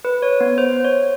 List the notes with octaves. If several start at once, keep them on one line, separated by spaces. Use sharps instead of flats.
B4
C#5
B3
C5
C#5